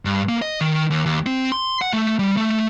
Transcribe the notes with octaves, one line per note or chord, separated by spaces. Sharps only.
G2
A#3
D#5
D#3
D#2
D#2
C4
C6
F#5
A3
G3
A3